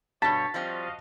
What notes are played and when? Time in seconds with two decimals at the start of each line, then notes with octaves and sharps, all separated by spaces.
0.22 G2 B2 C#5 A5 A6 B6
0.54 F3 G3 C4 F#4 D#5 F5